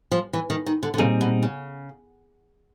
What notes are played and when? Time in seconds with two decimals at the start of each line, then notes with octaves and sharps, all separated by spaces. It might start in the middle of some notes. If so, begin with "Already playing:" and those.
0.12 F3
0.33 E3
0.50 D#3
0.66 D#3
0.83 D3
0.94 D3
0.98 A#2 C#3 G3 C4 D#4 G#4
1.21 B2
1.43 C#3